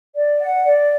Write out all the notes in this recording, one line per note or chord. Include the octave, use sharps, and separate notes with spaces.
D5
F#5
D5